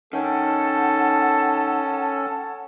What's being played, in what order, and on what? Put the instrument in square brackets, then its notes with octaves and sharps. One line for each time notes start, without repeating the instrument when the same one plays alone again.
[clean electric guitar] D#3 [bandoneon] C#4 [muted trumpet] A4 [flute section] F#5 G5 A5